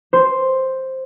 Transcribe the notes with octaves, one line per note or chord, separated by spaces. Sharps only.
C5